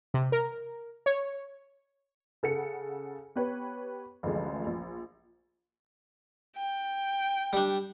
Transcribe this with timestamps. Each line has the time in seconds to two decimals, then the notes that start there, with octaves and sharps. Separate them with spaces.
0.14 C3
0.32 A#4
1.06 C#5
2.43 C#3 A4 F#5 C#7
3.36 B3 G4 B4 C#5
4.23 A1 D2 D3 F3 G#3
4.66 A#1
6.56 G5
7.53 G3 D4